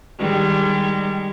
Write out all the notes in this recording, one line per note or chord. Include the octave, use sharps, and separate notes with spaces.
D#3 G3 G#3